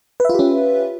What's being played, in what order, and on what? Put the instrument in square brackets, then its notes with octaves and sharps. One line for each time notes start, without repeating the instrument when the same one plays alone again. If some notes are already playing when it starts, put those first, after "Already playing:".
[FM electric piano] B4
E5
F4
G4
C#4